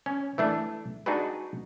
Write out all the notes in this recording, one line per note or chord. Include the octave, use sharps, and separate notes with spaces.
C#4
E3 A3 D4
D4 D#4 F#4 G#4 B4